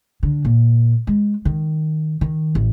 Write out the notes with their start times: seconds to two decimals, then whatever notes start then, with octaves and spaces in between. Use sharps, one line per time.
0.23 D3
0.45 A#2
1.07 G#3
1.45 D#3
2.21 D#3
2.55 A1